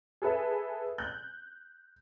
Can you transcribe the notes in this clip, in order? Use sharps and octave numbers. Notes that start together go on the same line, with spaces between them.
G#4 A4 B4 E5
F#6 G6